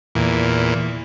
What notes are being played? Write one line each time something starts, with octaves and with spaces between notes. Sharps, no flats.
E2 A#2